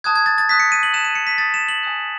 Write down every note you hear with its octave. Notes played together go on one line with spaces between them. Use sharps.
A5 D#6 F#6 G#6
G#6
A6
A6
A5 D#6 F#6 B6
C#7
D#7
F#7
A5 D#6 F#6 E7
D#7
C#7
B6
A5 D#6 F#6 A6
E7
F#7
G#5 D#6 F#6